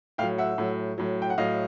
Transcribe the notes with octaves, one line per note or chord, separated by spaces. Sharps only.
A2 F#3 F5 G5
E5 F#5
A2 F#3
A2 F#3
G5
F#5
A2 F#3 D#5 F5